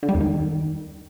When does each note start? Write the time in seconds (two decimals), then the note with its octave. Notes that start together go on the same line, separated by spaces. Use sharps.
0.03 D3
0.09 G3
0.15 E2
0.20 D#3